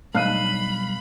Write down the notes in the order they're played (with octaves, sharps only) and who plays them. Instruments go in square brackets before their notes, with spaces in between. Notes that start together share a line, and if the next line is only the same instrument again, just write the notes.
[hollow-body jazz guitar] B1 G2 [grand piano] F5 F#6 D#7 [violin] B5